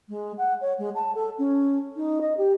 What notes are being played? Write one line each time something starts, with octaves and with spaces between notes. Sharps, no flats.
G#3
F#5
C#5
G#3
A5
A4
C#4
D#4
D#5
G4